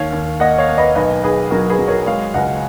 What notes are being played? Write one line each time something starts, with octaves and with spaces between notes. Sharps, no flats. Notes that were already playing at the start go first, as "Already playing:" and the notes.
Already playing: D#2 C#5 F5
D#2
A#3 D#5 F#5
C#5 F5
A#3
B4 D#5
B1 B4 D#5
B1 G#4 B4
F#3 F#4 A#4
G#4 B4
F#3
A#4 C#5
G#3 C#5 F5
C#2 D#5 F#5